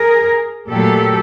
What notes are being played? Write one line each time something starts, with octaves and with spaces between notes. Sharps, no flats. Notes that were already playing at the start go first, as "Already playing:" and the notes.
Already playing: G#4 A#4
A#2 F#3 A3 G4 A4